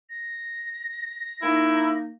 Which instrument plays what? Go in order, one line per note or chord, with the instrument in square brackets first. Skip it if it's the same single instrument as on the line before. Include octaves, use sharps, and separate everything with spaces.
[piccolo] A#6
[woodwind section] A#3 D#4 [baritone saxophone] E4